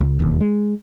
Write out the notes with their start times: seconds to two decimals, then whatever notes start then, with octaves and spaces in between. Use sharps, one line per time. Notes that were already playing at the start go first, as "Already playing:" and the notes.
0.01 C#2
0.20 E1 D#2
0.40 G#3